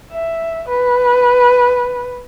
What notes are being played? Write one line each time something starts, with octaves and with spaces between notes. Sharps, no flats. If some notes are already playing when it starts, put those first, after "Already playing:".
E5
B4